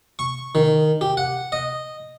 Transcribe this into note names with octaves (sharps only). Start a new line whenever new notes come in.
C#6
D#3
G4
F#5
D#5